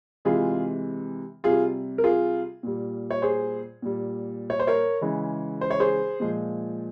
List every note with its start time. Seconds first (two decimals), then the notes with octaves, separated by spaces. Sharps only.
0.25 C3 E3 G#3 F4 G#4
1.44 C3 G3 F4 G#4
1.98 A#4
2.04 F4 G#4
2.63 A#2 G3
3.11 C#5
3.22 G#4 C5
3.82 A#2 G3
4.50 C#5
4.60 C5
4.67 A#4 C#5
5.01 C#3 E3 G#3
5.61 C5
5.70 C#5
5.80 G#4 C5
6.20 A#2 F3 G#3